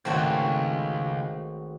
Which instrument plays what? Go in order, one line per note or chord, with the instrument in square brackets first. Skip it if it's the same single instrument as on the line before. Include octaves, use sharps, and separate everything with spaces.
[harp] G#1 A3 G#6 [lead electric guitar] C#2 [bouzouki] C4 F#4 C#5